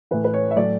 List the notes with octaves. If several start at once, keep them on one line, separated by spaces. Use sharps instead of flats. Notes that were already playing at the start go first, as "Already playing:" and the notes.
A2 E3 B4
B4
C#5
E5
A2 F#3 D5